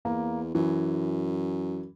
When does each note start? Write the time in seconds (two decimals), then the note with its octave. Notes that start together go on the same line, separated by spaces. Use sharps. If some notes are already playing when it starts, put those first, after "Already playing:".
0.05 E2 A#3
0.55 F#2 E3